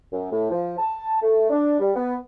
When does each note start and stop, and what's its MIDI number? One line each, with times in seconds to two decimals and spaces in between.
0.13 0.29 42
0.31 0.49 45
0.51 0.75 53
0.78 1.17 81
1.22 1.50 57
1.50 1.78 62
1.80 1.91 55
1.96 2.15 59